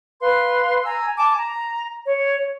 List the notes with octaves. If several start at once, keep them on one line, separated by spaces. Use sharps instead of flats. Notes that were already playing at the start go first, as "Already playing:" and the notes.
B4 F5 C6
G#5 A#5 E6
G#5 A5 D6
A#5
C#5